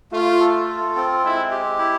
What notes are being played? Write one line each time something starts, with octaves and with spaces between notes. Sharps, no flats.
A3 F4
A4
F4
C4
G#3 E4
G4
E4